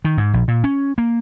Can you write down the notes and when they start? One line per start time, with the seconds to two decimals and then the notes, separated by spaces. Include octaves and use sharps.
0.05 D#3
0.17 G#2
0.34 A#1
0.48 A#2
0.64 C#4
0.98 A#3